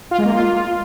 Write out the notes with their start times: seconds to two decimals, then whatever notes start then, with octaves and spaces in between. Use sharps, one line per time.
0.11 F4
0.18 G#3
0.26 A#3
0.33 F4